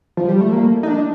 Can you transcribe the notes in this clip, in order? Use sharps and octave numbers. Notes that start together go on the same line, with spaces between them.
F3
G3
A3
A#3
D#4
D4